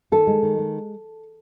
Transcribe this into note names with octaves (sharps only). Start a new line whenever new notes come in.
D#3 A4
G#3
D#3
G#3